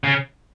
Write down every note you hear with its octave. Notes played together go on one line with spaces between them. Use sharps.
C#3